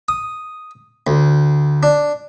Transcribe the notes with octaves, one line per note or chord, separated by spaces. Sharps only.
D#6
D2
D4